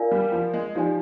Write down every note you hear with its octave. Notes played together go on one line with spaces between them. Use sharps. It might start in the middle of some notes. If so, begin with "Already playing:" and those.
Already playing: F4 A#4 D5 F5 G#5
G3
F3
G#3
F3 D#4 G4 D5 G#5